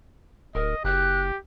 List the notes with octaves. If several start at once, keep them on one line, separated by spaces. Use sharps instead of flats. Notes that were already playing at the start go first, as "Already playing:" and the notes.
D1 A#4 D#5
F#1 G4 F#6